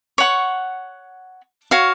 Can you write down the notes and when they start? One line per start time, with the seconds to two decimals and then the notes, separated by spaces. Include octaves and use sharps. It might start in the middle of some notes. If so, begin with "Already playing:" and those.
0.18 C#5 F#5 C#6
1.71 F#4 C#5 F5